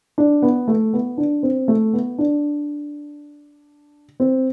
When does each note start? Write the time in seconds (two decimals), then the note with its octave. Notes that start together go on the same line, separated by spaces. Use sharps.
0.18 D4
0.42 B3
0.68 A3
0.93 B3
1.18 D4
1.43 C4
1.68 A3
1.93 B3
2.18 D4
4.20 C4